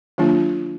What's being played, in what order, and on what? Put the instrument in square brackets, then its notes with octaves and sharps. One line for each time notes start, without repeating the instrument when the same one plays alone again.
[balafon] D#3 F#3 A#3 D4 F4